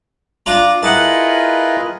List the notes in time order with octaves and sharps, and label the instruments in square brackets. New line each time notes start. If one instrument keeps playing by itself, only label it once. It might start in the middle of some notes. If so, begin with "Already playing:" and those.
[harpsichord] D4 F4 A#5
[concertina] E4 F4 A#4 [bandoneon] G#4 B4 D#5 [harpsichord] F#5 A5